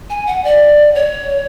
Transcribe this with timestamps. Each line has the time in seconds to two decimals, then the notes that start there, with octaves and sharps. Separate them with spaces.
0.10 G#5
0.27 F#5
0.44 D5
0.95 C#5